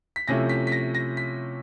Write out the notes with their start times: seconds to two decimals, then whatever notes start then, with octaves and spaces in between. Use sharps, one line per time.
0.16 B6
0.28 C3 F3 A3 C#4 E4 A#6
0.49 B6
0.67 B6
0.72 A#6
0.95 A#6
1.17 B6